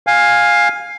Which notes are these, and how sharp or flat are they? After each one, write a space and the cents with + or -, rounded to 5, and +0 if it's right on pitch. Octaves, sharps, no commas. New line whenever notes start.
F5 +10 G#5 -10